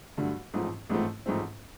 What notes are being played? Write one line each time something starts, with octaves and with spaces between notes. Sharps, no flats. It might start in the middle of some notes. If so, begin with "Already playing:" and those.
G2 D3 F#3 A3
A1 G#2 F3 A3 C4
A1 G#2 F3 A3 C4
A1 G#2 F3 A3 C4